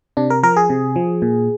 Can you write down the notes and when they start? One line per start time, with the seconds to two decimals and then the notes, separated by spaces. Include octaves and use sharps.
0.17 C3 D4
0.30 A#4
0.43 F3 A#4
0.56 G#4
0.70 C3
0.96 F3
1.22 A#2